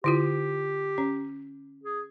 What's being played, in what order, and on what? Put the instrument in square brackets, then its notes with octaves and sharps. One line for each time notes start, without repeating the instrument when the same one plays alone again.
[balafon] D3 E4 F4 [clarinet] G4
[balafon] C#4
[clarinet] G#4